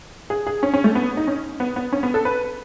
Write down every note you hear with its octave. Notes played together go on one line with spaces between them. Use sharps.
G#4
G#4
C#4
C#4
A3
B3
D#4
C#4
B3
B3
C#4
B3
A4
B4